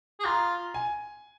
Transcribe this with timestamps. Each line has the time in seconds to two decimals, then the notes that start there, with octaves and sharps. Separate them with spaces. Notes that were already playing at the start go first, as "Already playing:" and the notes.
0.19 G#4
0.25 F4 A#5
0.74 G#5